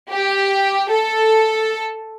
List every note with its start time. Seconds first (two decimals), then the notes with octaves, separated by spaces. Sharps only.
0.11 G4
0.91 A4